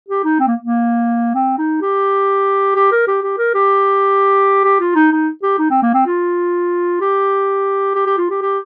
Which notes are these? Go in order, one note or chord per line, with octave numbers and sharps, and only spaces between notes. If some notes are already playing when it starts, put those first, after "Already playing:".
G4
D#4
C4
A#3
A#3
C4
D#4
G4
G4
A#4
G4
G4
A#4
G4
G4
F4
D#4
D#4
G4
D#4
C4
A#3
C4
F4
G4
G4
G4
F4
G4
G4